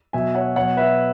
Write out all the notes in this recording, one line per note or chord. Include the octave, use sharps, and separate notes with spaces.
B2 F#3 E5 G#5
C#5 F#5
B2 F#3 C#5 F#5
B4 E5